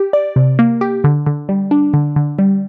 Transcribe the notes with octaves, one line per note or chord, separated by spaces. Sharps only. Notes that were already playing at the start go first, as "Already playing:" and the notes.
Already playing: G4
D5
C3
A#3
G4
D3
D3
G3
D4
D3
D3
G3